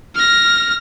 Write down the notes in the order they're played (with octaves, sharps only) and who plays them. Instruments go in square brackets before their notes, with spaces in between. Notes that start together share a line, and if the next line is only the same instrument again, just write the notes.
[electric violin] F6 A#6